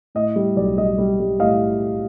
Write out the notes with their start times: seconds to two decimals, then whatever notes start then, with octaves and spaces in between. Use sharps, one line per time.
0.15 A2 D#5
0.36 G3
0.56 B1 D5
0.78 G3 D#5
0.98 G3
1.19 G3
1.40 A2 D#5 F5